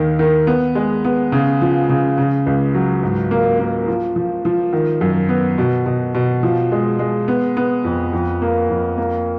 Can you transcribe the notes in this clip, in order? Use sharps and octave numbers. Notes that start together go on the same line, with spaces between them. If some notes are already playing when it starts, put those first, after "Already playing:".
Already playing: D#2 D#3
D#3
B3
G#3
B3
C#3
F3
C#3
C#3
C#2
F#3
G#2
A#3
A#3
F3
F3
F3
D#3
F#2
B3
B2
B2
B2
F3
G#3
G#3
B3
B3
F2
F2
A#3
F2
A#3